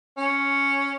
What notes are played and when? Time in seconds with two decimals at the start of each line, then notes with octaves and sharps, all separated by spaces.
0.17 C#4